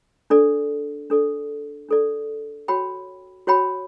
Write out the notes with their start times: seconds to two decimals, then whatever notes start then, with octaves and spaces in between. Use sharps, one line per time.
0.30 D4 A4 D5
1.10 D4 A4 D5
1.89 D4 A4 D5
2.68 F#4 C#5 G5 B5
3.47 F#4 C#5 G5 B5